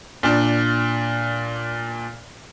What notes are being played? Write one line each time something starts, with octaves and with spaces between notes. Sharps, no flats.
A#2 D4